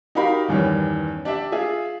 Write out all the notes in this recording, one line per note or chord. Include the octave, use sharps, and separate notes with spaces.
D#4 F#4 G4 A#4 F5 B5
E2 G2 D#3 G3 C#4
D4 G4 D5 E5
F4 G#4 E5